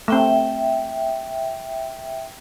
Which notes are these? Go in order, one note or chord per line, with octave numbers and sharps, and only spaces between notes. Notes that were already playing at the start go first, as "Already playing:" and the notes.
A3 C4 E5 G5